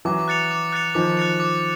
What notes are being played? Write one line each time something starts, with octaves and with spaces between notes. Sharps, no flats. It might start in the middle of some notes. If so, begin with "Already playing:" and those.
E3 F#3 D6
F#6 A6 C#7 F7
D6
F#6 A6 C#7 F7
D#3 F3 D6
F#6 A6 C#7 F7
D6